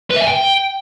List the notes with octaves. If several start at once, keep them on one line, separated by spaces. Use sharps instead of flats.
B4
E5
G#5
G5